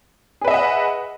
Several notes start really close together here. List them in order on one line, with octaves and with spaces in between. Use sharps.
G#4 B4 E5 D#5 F#5